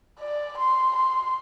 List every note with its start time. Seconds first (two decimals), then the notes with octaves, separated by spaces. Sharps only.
0.20 D5
0.58 C6
0.96 C6